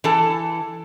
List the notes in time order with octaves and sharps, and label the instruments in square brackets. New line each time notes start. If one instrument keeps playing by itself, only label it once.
[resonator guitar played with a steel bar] E3 A4